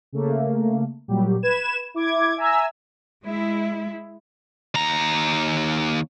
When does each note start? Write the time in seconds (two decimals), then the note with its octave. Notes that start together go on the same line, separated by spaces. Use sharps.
0.12 C#3 A3 A#3
1.08 A#2 F#3 G3 G4
1.43 B4 G#6 E7
1.94 E4 D6 G#6
2.37 E5 G#5 A#5 E6
3.25 G#3 E4
4.75 D#2 A#5